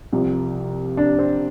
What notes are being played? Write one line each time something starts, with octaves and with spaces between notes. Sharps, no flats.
C2 C3 F3
D4
C4